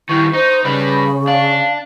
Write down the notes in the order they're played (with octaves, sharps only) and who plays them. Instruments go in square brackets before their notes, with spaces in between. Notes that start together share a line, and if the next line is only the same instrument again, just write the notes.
[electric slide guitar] D#3 G3 [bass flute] E4 [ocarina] C#6
[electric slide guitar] D#4 [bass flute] C5
[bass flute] C#3 [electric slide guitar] G3 B4 [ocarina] B5
[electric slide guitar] D4 [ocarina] F5